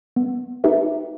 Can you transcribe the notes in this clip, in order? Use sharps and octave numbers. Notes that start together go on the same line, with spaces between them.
B3
D#4 G4 B4 E5